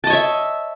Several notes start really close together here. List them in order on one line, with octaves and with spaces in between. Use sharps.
A5 D#5 C#5 E5